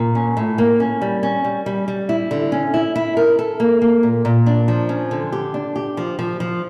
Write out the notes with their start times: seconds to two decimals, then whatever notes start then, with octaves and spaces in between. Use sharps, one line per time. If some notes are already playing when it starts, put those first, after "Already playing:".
Already playing: A#2
0.15 C#4
0.37 A2
0.58 A#3
0.80 C#4
1.02 G3
1.23 C#4
1.44 G3
1.66 G3
1.88 G3
2.09 E4
2.31 D3
2.52 C#4
2.74 E4
2.96 E4
3.17 A#4
3.39 A4
3.60 A#3
3.82 A#3
4.03 A#2
4.25 A#2
4.46 D4
4.68 F3
4.89 C#4
5.11 D3
5.32 G4
5.54 D4
5.76 G4
5.97 F3
6.19 F3
6.40 F3